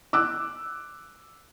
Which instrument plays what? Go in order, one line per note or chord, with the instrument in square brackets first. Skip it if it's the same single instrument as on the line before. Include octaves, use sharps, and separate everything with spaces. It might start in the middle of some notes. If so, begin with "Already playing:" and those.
[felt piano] D6 E6 F#6